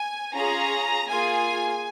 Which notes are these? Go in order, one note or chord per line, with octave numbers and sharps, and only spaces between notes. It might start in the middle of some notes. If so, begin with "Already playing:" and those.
Already playing: G#5
C#4 F4 G#4 A#5
A#3 F4 G#4 G#5